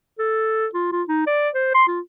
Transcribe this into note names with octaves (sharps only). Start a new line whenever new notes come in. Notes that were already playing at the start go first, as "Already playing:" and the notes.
A4
F4
F4
D#4
D5
C5
C6
F4